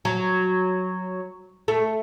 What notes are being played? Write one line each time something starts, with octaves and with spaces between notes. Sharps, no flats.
F#3
A3